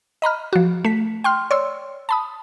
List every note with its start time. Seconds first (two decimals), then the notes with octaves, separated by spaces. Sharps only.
0.22 D#5 A#5 B5 F6
0.53 F3 F#4
0.85 A3 B6
1.24 G5 C6 F6
1.51 C#5 D5 C6 E6
2.09 A5 B5 D#6